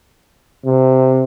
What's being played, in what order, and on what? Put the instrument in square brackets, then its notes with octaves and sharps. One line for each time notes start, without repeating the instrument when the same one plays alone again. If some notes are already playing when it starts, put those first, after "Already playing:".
[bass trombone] C3